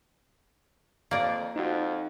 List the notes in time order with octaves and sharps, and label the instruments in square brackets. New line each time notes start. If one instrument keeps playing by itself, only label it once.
[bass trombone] F2 [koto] A#3 D5
[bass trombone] F2 [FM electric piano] D#4 F#4